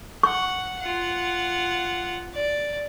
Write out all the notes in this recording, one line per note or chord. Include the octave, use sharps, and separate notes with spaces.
F#5 C#6
F4 F#5
D5